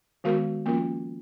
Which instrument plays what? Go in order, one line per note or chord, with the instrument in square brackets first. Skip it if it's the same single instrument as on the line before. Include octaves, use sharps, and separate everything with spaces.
[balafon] D#3 G#3 B3 F#4 A#4
F3 A#3 C#4 F4 A#4